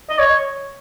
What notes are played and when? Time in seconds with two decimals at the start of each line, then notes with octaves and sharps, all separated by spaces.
0.10 D#5
0.19 C#5